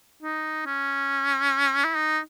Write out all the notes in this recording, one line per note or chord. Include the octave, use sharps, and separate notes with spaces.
D#4
C#4
E4
D#4